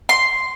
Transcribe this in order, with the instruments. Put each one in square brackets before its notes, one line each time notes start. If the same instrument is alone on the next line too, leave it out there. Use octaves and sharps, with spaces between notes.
[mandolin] C6